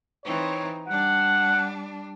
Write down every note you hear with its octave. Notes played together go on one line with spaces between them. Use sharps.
E3 C4 D#4 C#5
G3 D4 F#5